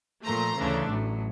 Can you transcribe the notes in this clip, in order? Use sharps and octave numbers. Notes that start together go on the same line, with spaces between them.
A#2 F3 A3 A#5 C6
D2 C#3 E3 A3 D4
A1 A2 F#3